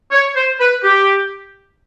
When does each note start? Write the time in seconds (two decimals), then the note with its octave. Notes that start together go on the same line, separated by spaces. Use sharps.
0.12 C#5
0.36 C5
0.60 B4
0.83 G4